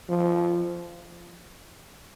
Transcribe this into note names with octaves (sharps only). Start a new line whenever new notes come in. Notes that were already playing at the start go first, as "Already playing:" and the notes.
F3